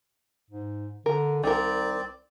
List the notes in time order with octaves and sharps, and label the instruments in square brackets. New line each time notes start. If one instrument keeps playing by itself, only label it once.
[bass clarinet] G#2
[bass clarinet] D3 [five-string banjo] A#4
[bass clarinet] C2 [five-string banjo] D#3 A#4 [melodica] C4 D5